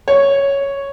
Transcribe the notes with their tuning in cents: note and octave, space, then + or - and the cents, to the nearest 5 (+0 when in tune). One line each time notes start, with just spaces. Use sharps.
C#5 +0